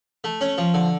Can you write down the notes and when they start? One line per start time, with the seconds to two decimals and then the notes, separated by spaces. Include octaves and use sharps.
0.24 A3
0.41 C#4
0.58 F3
0.74 D3